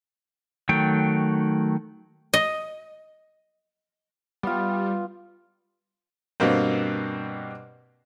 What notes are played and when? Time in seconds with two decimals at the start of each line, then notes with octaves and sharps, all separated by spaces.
0.69 D#3 F#3 A3 G5
2.34 D#5
4.43 G3 B3 F4
6.40 G2 B2 A#3 C4